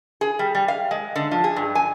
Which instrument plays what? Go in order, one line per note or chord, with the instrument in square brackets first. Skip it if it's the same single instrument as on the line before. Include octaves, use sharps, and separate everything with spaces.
[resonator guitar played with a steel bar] G#4
G3
G3
F5
G#3
D3
F3
G#4
G2
G#5